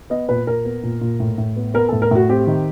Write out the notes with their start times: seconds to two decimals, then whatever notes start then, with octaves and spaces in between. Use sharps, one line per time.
0.10 B3 D#5
0.29 A#2 B4
0.47 A#2 A#4
0.65 B3
0.83 A#2
1.01 A#2
1.20 A2
1.38 A2
1.56 B3
1.74 B3 A#4
1.89 A2 A4
2.02 A#4
2.11 A2 F#4
2.29 C4 G4
2.47 D#3